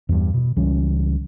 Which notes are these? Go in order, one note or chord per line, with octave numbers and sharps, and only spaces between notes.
E2 G2
B2
C#2 E3 G3 C#4